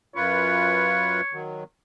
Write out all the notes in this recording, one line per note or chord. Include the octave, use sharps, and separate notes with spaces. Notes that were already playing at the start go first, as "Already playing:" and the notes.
F#2 F4 B4 C#5
D#3 F#3